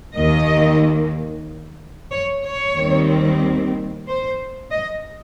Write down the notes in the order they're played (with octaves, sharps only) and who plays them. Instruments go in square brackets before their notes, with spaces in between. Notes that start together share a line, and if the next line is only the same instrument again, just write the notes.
[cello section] D#2 D#3 A#3 D#5
C#5
C#5
D#2 D#3 G3 C4
C5
D#5